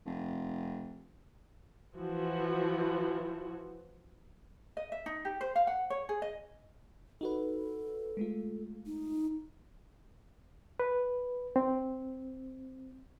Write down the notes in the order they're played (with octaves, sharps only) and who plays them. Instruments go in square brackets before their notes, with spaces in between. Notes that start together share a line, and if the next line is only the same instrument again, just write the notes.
[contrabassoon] F1
[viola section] E3 F3 F#4
[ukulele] D#5
E5
D#4
G4
C5
F5
F#5
C#5
G#4
D#5
[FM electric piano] D#4 F#4 B4 [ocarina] A4
[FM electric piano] G#3 A3 F4
[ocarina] D#4
[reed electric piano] B4
C4